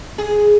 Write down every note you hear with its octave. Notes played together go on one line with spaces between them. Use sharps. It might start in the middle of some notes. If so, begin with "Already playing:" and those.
G#4